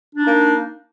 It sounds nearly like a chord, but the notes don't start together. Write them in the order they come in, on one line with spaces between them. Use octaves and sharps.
D4 D#4 A#3